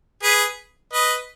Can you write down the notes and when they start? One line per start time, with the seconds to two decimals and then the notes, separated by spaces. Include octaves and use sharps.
0.23 G#4 B4
0.93 B4 D#5